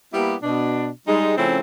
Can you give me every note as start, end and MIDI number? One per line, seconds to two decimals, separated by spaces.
0.13 0.35 55
0.13 0.35 58
0.13 0.35 59
0.13 0.35 64
0.13 0.35 67
0.42 0.88 47
0.42 0.88 62
1.07 1.37 55
1.07 1.37 56
1.07 1.37 63
1.37 1.60 49
1.37 1.60 53
1.37 1.60 57
1.37 1.60 60
1.37 1.60 61
1.37 1.60 64